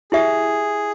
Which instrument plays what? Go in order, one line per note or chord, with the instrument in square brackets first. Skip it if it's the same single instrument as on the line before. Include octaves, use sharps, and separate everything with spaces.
[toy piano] E4 G4 E5 [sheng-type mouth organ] G#4